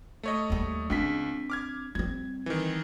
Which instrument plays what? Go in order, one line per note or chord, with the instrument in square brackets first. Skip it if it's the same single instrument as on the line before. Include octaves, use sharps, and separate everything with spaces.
[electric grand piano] A3 C#5 D#5
[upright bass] D#2 G3
[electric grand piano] C#2 B6 [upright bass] C4 D4
[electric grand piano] D6 F6 G#6
[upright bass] G3 C4 [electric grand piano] G#6
[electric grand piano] D#3 E3